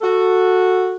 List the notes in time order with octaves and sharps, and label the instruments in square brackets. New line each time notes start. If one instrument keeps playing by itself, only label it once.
[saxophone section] F#4 A4